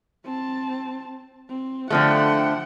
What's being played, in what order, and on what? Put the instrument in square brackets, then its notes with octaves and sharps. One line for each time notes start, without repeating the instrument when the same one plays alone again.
[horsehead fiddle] C4 A5
C4
[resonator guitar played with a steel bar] D3 F3 A3 [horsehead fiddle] F#5 G5